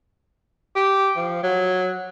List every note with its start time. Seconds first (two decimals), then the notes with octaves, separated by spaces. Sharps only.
0.75 G4
1.16 F3
1.43 F#3